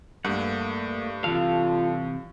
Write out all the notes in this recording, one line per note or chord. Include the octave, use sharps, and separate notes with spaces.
G2 A3 A#3 F#5
C3 E3 F4 A4 F5